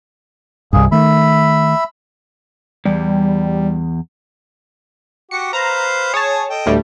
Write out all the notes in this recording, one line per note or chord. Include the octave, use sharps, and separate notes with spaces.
C2 G2 A#3 G#4
D#3 A3 E5 B5
E2 G3
F#4 G4 C#7
B4 C5 F5 A#5
G#4 C#5 G#5 A5 D#6
A4 D#5 G5
D2 A2 G3